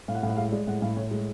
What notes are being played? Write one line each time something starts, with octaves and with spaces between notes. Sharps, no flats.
A2 F5
F#5
A2 F5
F#5
G#3 F5
G#3 D5
A2 F#5
A2 F5
A2 C#5
G#3